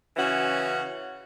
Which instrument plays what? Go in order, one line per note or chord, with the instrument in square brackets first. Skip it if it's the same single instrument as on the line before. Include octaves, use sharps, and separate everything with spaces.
[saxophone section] C#3 E3 C#4 F#4